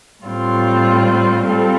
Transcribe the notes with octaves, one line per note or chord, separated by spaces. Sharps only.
A2 G3 C4 F4
G3 C4 F4 A4